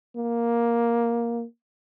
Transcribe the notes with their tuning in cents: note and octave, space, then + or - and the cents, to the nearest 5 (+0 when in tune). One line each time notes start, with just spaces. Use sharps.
A#3 +5